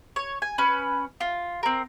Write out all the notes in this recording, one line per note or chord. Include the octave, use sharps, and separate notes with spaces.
C#5
G#5
C#4 B4
F4
C4 A#4